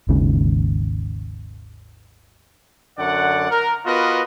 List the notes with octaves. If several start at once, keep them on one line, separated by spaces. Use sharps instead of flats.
G#1 D#2 G#2 C#3
F#2 D3 D5 F#5
A#4
B3 F4 F#4 A#4 B4 D#5